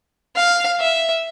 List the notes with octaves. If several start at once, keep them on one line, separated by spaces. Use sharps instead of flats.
F5
E5